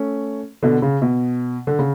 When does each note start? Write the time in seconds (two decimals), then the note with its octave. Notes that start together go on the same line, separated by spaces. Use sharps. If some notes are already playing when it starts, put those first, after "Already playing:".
Already playing: A3 C#4
0.63 B2 D3
0.82 C#3
1.02 B2
1.67 D3
1.79 C#3